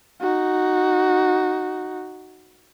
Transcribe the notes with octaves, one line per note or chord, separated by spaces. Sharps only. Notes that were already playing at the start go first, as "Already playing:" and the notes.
D#4 F#4